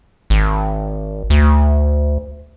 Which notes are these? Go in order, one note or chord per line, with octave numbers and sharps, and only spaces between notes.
G#1
D2